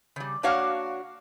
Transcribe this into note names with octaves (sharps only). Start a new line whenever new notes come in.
C#3 G3
A#3 D4 F#4 C#5 F5 F#5